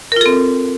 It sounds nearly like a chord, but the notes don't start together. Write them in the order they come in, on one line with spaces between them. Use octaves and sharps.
A#4 F4 A4 C4